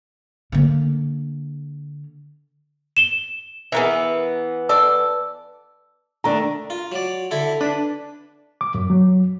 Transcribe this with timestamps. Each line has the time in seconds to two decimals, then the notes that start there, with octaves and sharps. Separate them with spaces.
0.52 D3 A#3
2.97 E7 G7
3.72 E3 B3 G#4 A#4 E5
4.69 A4 D5 E6
6.24 D#3 A3 D4 A#5
6.70 F4
6.92 F#3 D5
7.31 D3 E4 A4
7.61 D4 B4
8.61 D6
8.74 F#2
8.90 F#3